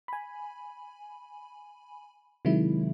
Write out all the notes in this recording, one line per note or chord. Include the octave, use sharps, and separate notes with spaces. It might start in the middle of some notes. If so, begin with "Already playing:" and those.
G#5 B5
C3 D#3 F#3 G#3 E4